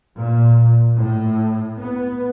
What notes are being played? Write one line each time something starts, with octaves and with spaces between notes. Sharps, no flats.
A#2
A2
B3